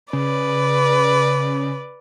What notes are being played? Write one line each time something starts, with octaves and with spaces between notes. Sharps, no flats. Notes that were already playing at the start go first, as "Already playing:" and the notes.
C#3 B4 D5